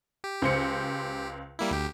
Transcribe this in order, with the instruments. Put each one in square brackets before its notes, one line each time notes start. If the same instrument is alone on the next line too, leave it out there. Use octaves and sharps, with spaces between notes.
[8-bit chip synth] G4
[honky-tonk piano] C#2 C5 C#7
[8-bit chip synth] G3 A#3 E4
D2 G4